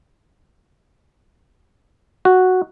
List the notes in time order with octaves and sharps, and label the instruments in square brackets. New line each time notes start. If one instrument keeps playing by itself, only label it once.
[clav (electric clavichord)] F#4